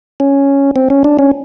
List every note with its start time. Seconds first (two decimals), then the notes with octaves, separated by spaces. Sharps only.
0.20 C#4
0.76 C4
0.90 C#4
1.04 D4
1.19 C#4